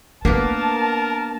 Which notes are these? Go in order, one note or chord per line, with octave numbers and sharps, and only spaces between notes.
A#3 B3 D4 A#4 A5